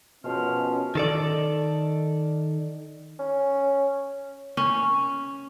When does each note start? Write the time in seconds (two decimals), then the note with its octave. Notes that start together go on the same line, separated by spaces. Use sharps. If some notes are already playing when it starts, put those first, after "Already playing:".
0.24 F#2 B2 F3 G#3 C#4 C5 F6
0.95 D#3 A4 D5
3.19 C#4
4.57 C#4